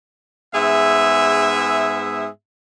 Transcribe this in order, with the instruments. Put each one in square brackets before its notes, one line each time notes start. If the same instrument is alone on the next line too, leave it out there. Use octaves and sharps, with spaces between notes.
[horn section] G#2 B3 G#4 E5